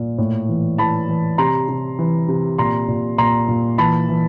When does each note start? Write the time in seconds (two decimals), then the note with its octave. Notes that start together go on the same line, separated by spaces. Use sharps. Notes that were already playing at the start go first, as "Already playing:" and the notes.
Already playing: A#2
0.18 A2
0.49 E3
0.78 E3 A5 B5
1.08 E3
1.38 C3 A#5 C6
1.68 C3
1.99 E3
2.28 C3
2.58 A#2 A#5 C6
2.89 A#2
3.18 A#2 A#5 C6
3.48 A#2
3.78 E3 A5 B5
4.09 E3